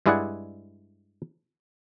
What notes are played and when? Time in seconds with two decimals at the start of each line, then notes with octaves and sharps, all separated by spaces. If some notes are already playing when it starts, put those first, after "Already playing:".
0.06 G2 G#3 E4 G#4 D5 F#5